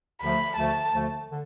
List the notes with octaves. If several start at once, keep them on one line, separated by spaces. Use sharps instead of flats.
D2 D3 F3 A3 B5
D2 D3 F3 A3 A5
D2 D3 F3 A3
D3